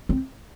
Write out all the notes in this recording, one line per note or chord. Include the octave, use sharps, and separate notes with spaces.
C4